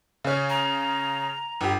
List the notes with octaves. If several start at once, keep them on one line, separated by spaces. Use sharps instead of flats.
C#3 C#4
A#5
G1 G4